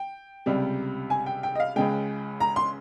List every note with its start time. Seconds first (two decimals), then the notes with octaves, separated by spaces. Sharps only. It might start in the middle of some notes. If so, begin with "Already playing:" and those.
Already playing: G5
0.46 C#2 C3 G3
1.10 G#5
1.26 G5
1.43 G5
1.55 D#5
1.60 F5
1.76 C#2 C#3 G#3 G5
2.40 A#5
2.56 C6